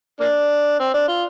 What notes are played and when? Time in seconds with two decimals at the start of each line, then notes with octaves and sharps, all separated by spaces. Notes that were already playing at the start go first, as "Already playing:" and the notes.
0.21 A#3 D4
0.79 C4
0.94 D4
1.08 F4